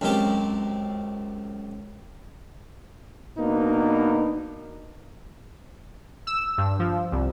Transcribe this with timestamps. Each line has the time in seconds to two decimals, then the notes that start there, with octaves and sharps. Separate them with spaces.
0.01 C#2 F#2 C4 G4 A5
3.38 B2 A#3 D4 D#4 B4
6.27 E6
6.58 G2
6.79 F3
7.12 C2